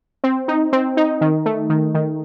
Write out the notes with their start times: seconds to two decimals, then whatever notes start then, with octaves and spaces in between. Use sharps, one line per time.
0.24 C4
0.48 D#4
0.73 C4
0.97 D#4
1.21 D#3
1.46 A3
1.70 D#3
1.94 D#3